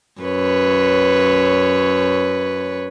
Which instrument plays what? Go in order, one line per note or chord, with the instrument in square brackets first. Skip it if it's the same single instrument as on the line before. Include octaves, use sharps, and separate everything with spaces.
[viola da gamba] F#2 B4 C#5